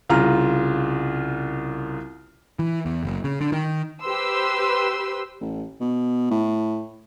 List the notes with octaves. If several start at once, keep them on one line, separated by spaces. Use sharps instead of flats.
C2 C#3 F4 A#5 F6
E3
E2
F#1
C#3
D3
D#3
G4 B4 C5 C6 E6
A1
B2
A2